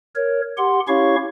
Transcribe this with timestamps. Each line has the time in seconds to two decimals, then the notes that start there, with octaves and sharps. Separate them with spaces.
0.15 A#4 C#5
0.58 G4 F#5 C6
0.88 C#4 E4 G4 C#5 F5 C#6